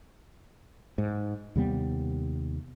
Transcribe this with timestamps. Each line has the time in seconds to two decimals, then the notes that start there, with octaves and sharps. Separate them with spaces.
0.98 G#2
1.56 D#2 C3 G3 B3